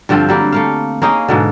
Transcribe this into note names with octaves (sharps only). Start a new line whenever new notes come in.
G2 D3 F3 C4
F#3 G3 A#3
A3 A#3 F5
A#3 C#4 D#4 G#4
G#2 B2 D3